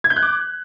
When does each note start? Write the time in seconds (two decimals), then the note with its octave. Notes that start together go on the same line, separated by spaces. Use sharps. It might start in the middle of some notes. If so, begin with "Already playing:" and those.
0.04 G#6
0.10 G6
0.16 F#6
0.22 D6